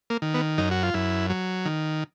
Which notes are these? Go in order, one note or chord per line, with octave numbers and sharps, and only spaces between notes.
A#3
D#3
B3
F#2 D#4
F#4
F4
F#2 E4
F#3
D#3